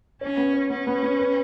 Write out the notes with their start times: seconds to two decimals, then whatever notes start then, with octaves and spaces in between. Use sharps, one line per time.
0.21 C#4 C#5
0.37 B3
0.54 C#5
0.70 B3 C#4
0.87 B3
1.02 B3
1.19 B4